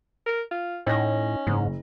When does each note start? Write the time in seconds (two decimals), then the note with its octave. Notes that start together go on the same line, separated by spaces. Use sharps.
0.26 A#4
0.51 F4
0.87 A2 C#4 D#4 A#6
1.47 F#1 G#2